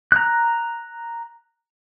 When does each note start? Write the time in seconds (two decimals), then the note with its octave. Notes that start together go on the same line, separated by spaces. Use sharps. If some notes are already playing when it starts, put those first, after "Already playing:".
0.12 A#5 F#6